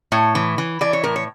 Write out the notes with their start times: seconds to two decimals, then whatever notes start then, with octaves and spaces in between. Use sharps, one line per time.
0.12 A2 C#5
0.35 E3
0.58 E3
0.81 E3 D5
0.93 C#5
1.03 A2 A#4
1.16 C#5